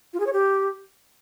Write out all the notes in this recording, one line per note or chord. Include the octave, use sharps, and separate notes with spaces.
F4
G#4
C#5
G4